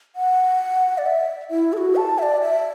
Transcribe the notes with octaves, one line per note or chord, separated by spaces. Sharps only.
F#5
D5
E5
E4
A4
F#4
A5
E5
D5
E5